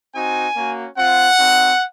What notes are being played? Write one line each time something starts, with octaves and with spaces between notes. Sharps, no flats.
C4 D#4 F#4 G#5
A#3 C#4 F#4
C4 F4 F#5
C4 D#4 F#4